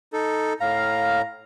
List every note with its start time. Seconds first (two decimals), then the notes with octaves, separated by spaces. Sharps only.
0.13 D#4 A4
0.60 A2 F5 A#5